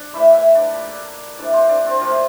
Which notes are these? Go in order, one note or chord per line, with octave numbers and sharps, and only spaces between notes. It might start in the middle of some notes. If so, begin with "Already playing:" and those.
Already playing: D4 D5
A2 E3 A3 E4 E5
E4 E5
D4 D5
A#2 G3
A2 E3 G3 D4 D5
C4 C5
D4 D5
C4 C5
A#2 F3 A3 F4